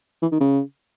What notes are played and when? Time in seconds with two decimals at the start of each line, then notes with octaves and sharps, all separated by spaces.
0.22 E3
0.32 D#3
0.41 C#3